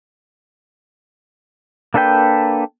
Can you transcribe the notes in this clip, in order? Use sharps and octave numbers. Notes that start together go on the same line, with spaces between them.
A#3 D4 A4 B4 G5